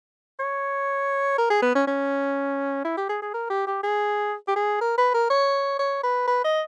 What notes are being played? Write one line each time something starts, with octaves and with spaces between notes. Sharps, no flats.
C#5
A#4
G#4
B3
C#4
C#4
E4
G4
G#4
G#4
A#4
G4
G4
G#4
G4
G#4
A#4
B4
A#4
C#5
C#5
B4
B4
D#5